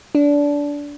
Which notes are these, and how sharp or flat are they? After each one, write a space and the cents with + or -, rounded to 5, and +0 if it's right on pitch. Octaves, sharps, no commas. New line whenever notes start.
D4 -20